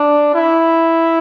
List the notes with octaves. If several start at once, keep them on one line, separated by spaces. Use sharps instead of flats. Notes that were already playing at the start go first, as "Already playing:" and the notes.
Already playing: D4
E4